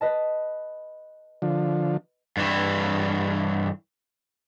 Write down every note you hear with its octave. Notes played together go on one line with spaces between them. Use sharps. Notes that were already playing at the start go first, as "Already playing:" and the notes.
B4 D#5 A5
D3 F3
G2 E3